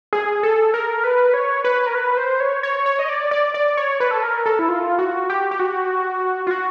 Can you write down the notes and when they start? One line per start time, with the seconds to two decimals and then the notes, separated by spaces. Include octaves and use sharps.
0.13 G#4
0.43 A4
0.74 A#4
1.04 B4
1.34 C#5
1.64 B4
1.87 A#4
1.95 B4
2.17 C5
2.40 C#5
2.63 C#5
2.86 C#5
2.99 D#5
3.09 D5
3.31 D5
3.54 D5
3.77 C#5
4.00 B4
4.11 A4
4.23 A#4
4.46 A4
4.59 E4
4.69 F4
4.99 F#4
5.30 G4
5.51 G4
5.59 F#4
6.47 F4
6.51 F#4